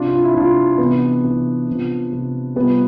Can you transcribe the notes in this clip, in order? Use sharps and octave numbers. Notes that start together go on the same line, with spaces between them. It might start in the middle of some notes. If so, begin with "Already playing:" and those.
Already playing: C3 F3 D4 F4
F4
E4
C3 F3 D4 F4
C3 E3 B3 D4
C3 E3
C3 F3
C3 F3
C3 F3 G3 B3